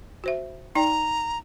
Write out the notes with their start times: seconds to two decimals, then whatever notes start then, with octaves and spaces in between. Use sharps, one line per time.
0.24 F#4 C5 E5
0.75 D#4 D5 G5 A#5